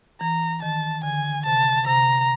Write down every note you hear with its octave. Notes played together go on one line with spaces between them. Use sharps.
E3 A#5
D#3 A5
D3 G#5
C3 A5
C3 A#5